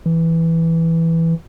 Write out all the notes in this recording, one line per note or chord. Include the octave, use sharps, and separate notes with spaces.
E3